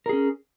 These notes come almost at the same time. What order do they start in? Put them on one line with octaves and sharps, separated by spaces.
A#4 G#4 C#4